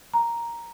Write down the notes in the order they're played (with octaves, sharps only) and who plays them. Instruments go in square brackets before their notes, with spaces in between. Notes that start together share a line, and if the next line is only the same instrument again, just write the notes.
[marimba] A#5